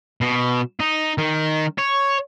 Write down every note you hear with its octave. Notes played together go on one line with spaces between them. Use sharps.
B2
D#4
D#3
C#5